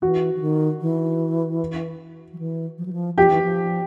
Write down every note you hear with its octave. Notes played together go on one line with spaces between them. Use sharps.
E3 F#4
E3
D#3
E3
F3
E3
F3
F#3
F3
F3 G4
E3
F3